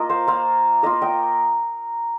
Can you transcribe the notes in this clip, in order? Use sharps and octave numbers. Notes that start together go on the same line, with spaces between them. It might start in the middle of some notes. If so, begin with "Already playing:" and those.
Already playing: A#3 F4 A#4 D#5
C5 F5
A#3 F4 C5 F5
A#3 F4 A#4 D#5
D#5 G5